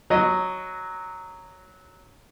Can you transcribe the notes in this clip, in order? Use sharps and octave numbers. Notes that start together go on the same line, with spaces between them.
F#3 D#5